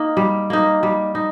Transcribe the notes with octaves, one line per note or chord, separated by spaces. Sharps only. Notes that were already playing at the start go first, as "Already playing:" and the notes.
Already playing: A#3 D#4
G3
A#3 D#4
G3
D#4